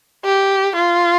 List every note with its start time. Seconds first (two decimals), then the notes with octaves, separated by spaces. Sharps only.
0.24 G4
0.76 F4